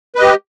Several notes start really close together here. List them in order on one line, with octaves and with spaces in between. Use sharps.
B4 D#5 G4